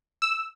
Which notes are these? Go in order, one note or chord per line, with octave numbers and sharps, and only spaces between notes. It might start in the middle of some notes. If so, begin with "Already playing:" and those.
E6